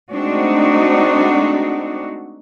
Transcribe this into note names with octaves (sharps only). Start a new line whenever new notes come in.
G#3 A3 C4 D4 D#4 F#4